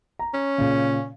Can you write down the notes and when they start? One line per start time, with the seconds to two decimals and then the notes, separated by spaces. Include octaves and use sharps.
0.19 A#5
0.34 C#4
0.58 A#2 C#3